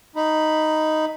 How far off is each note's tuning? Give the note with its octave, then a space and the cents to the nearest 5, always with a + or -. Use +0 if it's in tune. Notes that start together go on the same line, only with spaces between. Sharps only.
D#4 +0 B5 +0